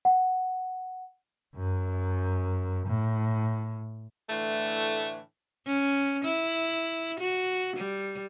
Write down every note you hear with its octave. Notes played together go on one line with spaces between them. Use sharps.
F#5
F#2
A2
A2 D3 E3 A3
C#4
E4
F#4
G3